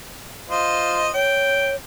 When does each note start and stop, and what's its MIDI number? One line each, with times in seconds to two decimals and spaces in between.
0.49 1.09 65
0.49 1.09 72
0.49 1.09 75
1.14 1.76 73
1.14 1.72 79